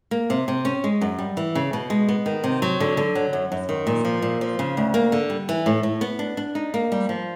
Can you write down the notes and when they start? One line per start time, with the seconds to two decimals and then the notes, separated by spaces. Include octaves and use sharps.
0.11 A#3
0.30 C3
0.48 C3
0.65 C#4
0.84 G#3
1.01 F#2
1.19 G3
1.37 E3
1.55 C#3
1.73 B2
1.90 G#3
2.09 B3
2.26 D#3
2.44 C3
2.62 F#3
2.80 D3
2.97 D3
3.15 F#3
3.33 F#2
3.52 F#2
3.69 D#3
3.87 A#2
4.05 F3
4.22 A#2
4.41 F3
4.59 C#3
4.77 D2
4.94 A#3
5.12 D3
5.30 G3
5.49 E3
5.66 A2
5.83 A2
6.01 B3
6.19 D4
6.37 D4
6.55 D#4
6.74 A#3
6.92 G3
7.09 F3